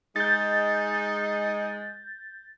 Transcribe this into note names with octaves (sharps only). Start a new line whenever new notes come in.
G#3 D#4 G6 A6